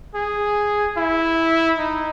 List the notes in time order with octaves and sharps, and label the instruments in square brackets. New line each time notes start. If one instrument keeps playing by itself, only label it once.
[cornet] G#4
E4
D#4